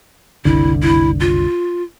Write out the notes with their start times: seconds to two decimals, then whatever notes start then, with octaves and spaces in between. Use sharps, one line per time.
0.45 F#1 C2 D3 E4
0.82 E4
1.20 F4